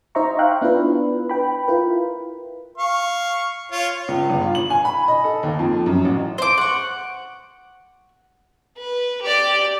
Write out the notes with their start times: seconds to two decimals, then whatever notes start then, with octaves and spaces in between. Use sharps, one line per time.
0.15 D#4 C5 D#5 E5 A#5 C#6
0.39 E5 F5 G5 F#6
0.61 B3 D4 E4 F4 B4
1.30 B4 G5 B5
1.68 E4 F4 A#4 B4
2.78 F5 C#6
3.71 F4 C#5
4.08 C#2
4.29 G1
4.41 F4
4.55 F#7
4.70 G#5
4.85 B5
5.08 D#5
5.24 A4
5.43 D#2
5.59 F2
5.86 F#2
6.05 A1
6.38 C5 D6
6.58 F#5 C#6
8.77 B4
9.22 G4 D5